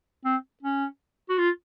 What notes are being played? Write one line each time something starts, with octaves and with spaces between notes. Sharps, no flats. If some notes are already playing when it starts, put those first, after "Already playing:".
C4
C#4
F#4
F4